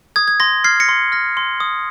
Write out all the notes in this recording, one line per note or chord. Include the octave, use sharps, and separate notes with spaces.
D#6 G#6
G#6
C6 A#6
F6 G#6 C7
A#6 C#7
C6
F6 A#6
C6
D#6